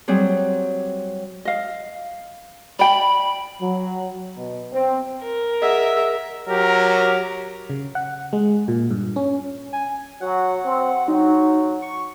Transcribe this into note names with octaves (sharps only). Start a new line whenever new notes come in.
F#3 G3 C4 G#4
D#5 F5
D5 G5 B5
F#3
B2
C4
A#4
G#4 D#5 E5 F#5
F#3 G4 A#4
C#3
F#5
G#3
A#2
G2
C#4
G#5
F#3 F#5
C4
F#3 D#4
C#6